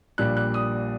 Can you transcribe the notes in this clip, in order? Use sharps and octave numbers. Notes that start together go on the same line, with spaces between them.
A#1 A#2 G3 D4 F#6
F#6
D#6